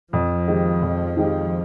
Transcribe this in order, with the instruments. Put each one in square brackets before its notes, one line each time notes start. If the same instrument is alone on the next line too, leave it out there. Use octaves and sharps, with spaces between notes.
[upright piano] F2 [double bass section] F3
[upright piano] D#3 G#3 D#4 G4
F2
D#3 G#3 D#4 G4